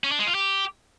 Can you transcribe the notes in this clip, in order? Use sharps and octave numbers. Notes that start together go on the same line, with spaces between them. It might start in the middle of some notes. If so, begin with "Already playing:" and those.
C#4
D4
G#3
F4
G4